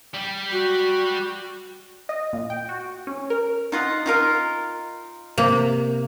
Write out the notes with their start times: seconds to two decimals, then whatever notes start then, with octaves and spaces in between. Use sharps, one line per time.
0.14 G3 G4
0.52 F#4
2.09 D#5
2.33 A#2
2.50 G5
2.69 F#4
3.07 C#4
3.30 A#4
3.72 D#4 F4 F#5
4.06 D#4 F4 A#4
5.38 C3 A#3